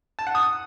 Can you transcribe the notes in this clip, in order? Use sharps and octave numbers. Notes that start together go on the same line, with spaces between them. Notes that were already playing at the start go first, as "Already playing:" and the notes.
A5
F#5
D#6